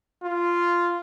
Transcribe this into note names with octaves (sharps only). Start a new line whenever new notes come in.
F4